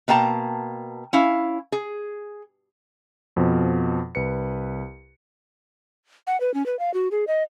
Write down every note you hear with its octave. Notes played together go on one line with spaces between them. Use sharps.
B2 A#3 G5 A5 A#5
C#4 E4 F5
G#4
F2 B2 F3
C2 B4 C#7
F#5
B4
C#4
B4
F5
F#4
G#4
D#5